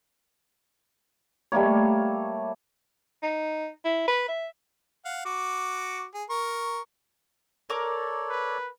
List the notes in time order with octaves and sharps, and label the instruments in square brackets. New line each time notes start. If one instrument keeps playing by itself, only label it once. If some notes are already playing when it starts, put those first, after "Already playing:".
[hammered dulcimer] G3 A3 A#3 C#5
[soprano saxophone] D#4
E4
B4
E5
[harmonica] F5 F#5
F#4 D6
G#4
A#4 C#6
[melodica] A4 C#5 D5 [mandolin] A#4 D6
[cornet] B4